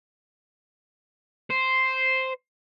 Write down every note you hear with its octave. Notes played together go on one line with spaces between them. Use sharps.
C5